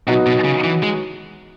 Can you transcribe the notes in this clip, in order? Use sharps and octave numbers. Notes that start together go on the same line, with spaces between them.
B2 F#3 B3 D#4 F#4
B2
C#3
E3
G#3